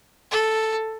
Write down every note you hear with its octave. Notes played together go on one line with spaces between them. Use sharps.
A4